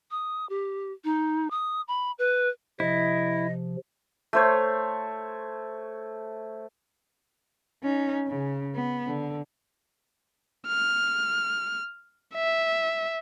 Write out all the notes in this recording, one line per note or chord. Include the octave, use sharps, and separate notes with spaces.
D#6
G4
D#4
D#6
B5
B4
C3 F3 E4 D#5
A3 C5 C#5
C#4 D#4
C#3
B3
D3
F6
E5